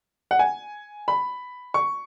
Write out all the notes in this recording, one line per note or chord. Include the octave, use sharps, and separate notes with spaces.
F#5
G#5
B5
C#6